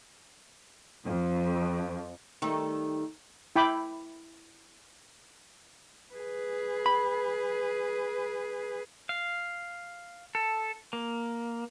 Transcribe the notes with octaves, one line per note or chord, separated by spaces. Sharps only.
F2
D#3 G3 A3
E4 G5 B5 D6
G#4 B4
B5
F5
A4
A#3